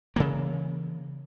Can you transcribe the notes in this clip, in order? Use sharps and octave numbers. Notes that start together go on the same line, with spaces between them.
C#3 E3 A#3